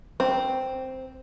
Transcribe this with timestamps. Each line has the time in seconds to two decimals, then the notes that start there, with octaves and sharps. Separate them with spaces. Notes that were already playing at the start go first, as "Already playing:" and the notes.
0.20 C4